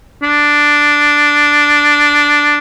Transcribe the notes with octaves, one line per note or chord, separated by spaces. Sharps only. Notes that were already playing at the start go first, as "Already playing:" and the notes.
D4